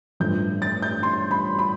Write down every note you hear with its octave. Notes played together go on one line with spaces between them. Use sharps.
A1 G2 F3 A3 G6
A6
G6
C6
B5
B5